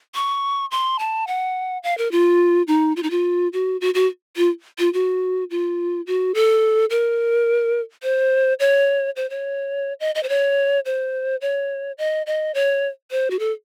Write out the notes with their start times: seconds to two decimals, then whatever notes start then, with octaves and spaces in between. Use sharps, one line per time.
0.15 C#6
0.71 C6
0.99 A5
1.27 F#5
1.83 F5
1.98 A#4
2.12 F4
2.68 D#4
2.96 F4
3.03 D#4
3.11 F4
3.53 F#4
3.81 F#4
3.94 F#4
4.37 F4
4.79 F4
4.93 F#4
5.50 F4
6.07 F#4
6.34 A4
6.90 A#4
8.03 C5
8.60 C#5
9.16 C5
9.30 C#5
10.00 D#5
10.15 D#5
10.23 C5
10.29 C#5
10.85 C5
11.41 C#5
11.98 D#5
12.26 D#5
12.55 C#5
13.11 C5
13.30 F#4
13.39 A4